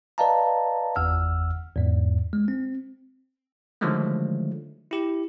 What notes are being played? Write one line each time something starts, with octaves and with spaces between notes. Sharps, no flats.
B4 D5 D#5 F5 A5 A#5
G1 E2 F#5 E6 F6
E2 G#2
G#3
C4
D3 D#3 F3 F#3 G#3 A3
E4 G4